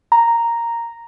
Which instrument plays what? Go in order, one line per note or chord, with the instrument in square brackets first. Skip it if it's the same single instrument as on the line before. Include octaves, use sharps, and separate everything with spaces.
[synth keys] A#5